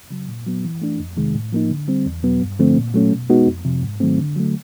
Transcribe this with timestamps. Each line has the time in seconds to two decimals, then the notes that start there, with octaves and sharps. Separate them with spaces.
0.11 C#3 F#3
0.29 A#2
0.46 F#3 B3
0.64 E3
0.82 A3 D4
0.99 F2
1.17 C3 D#3 G#3
1.35 A2
1.53 F3 A#3 D#4
1.71 D3
1.88 G3 C4
2.06 E2
2.23 B2 F#3 B3
2.41 G2
2.59 D3 F3 A3 C4
2.77 A#2
2.94 F#3 A3 C#4
3.12 B2
3.30 G#3 B3 D#4 F#4
3.47 F2
3.65 C3 F3
3.83 G#2
4.00 D#3 F#3 A3 C4
4.19 D3
4.36 F#3 A3